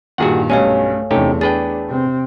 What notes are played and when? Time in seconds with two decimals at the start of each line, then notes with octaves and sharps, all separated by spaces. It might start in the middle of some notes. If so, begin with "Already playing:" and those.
0.18 G2 A#2 D#3 F#4 G#4 F#5
0.50 B1 G2 A3 C#4 C#5 F5 G#5
1.11 E2 C3 A3 C#4 D#4 G4
1.41 D4 G#4 B4 G5 A6
1.89 C3 C4